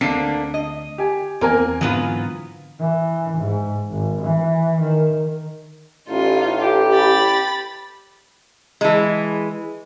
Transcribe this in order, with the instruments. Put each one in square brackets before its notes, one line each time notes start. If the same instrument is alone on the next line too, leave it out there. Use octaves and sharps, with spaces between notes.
[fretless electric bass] D2 C4 [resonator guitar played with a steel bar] D3 A#3 D4 [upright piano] B6 C7
[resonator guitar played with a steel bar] D#5
[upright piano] G4 G#5
[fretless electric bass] E2 [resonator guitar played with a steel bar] A#3 [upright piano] C4 A#4 G#5
[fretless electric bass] G#2 D3 E3 [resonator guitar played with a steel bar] F#3 B3 F4
[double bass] E3
G#2
G#1
E3
D#3
[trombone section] A1 [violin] D#4 F4
[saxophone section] G4
[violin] B5 A6
[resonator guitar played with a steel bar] E3 G#3